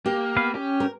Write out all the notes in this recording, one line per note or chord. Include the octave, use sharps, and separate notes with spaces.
A#3 G4
B3 B4 F5
C#4 G4
A#4